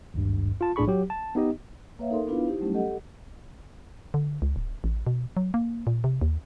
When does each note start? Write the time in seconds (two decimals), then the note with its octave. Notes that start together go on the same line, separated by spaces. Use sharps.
0.14 G#1 D2 G2
0.61 F4 A5
0.76 B1 A2 D4 G#4 B5 C#6
0.87 F#3 G4
1.10 A5
1.35 B3 D#4 G4 D#5
1.99 A#3 B4 C#5 E5 F5
2.11 D#4 A4 A#4 C6
2.27 B3 D4 E4 F4 B4 F5
2.48 D#4 E4 G4 C5
2.60 F#3 G3 A3 C#4
2.74 G4 A4 D#5 F#5
4.14 D3
4.42 C#2
4.56 D1
4.84 A1
5.07 B2
5.37 F#3
5.54 A#3
5.87 A#2
6.04 C3
6.21 D#2